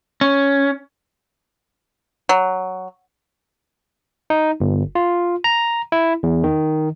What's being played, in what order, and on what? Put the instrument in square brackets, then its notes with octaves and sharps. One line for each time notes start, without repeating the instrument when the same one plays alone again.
[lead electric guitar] C#4
[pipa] F#3
[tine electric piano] D#4
G1
F4
A#5
E4
E2
D#3